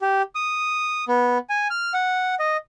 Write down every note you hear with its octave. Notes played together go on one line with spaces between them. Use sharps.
G4
D#6
B3
G#5
F6
F#5
D#5